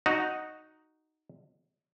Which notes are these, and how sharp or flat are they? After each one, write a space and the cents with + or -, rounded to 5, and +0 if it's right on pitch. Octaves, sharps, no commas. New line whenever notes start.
D#4 +0 F#4 +0